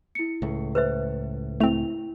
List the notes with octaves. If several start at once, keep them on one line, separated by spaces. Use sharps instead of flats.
E4 C#7
C#2 A2
B4 C5 E5
A3 C4 E4 F7